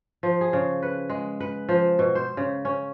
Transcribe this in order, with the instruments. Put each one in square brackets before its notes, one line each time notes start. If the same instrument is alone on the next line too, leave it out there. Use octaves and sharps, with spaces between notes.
[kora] F3
G#4
C#3
B4
G#3
B4
F3
B2
C5
C#3
C#4